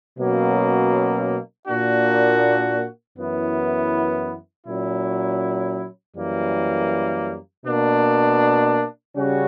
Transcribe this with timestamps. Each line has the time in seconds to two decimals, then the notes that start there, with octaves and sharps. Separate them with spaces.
0.17 B2 F#3 A#3 C#4
1.67 A#2 A#3 D4 F#4
3.16 F#2 E3 B3 E4
4.66 A#2 F#3 C#4 E4
6.15 F#2 E3 G3 A#3
7.65 B2 A#3 D4
9.15 C#3 G3 C#4 F#4